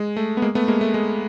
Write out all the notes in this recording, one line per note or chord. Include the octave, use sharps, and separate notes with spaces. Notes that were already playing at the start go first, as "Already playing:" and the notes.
Already playing: G#3
A3
B3
G#3 A#3
A3 B3
G#3 A#3
A3
G#3